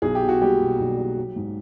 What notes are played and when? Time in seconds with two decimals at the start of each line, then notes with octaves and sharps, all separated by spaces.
0.02 B1 G#4
0.15 G4
0.21 B2
0.29 F#4
0.41 G3 A#3 G4
0.60 B2
0.79 B1
0.97 G3
1.17 F#3
1.36 G#2